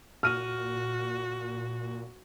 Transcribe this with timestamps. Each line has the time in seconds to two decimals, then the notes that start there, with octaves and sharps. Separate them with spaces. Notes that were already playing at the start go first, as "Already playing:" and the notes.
0.23 A#2 F#4 F6 D#7